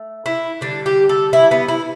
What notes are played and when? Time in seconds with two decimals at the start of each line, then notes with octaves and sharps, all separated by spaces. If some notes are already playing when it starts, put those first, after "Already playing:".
Already playing: A3
0.26 E4
0.61 D3 G3 D4
0.86 G4
1.09 A4
1.33 E4
1.51 B3
1.68 E4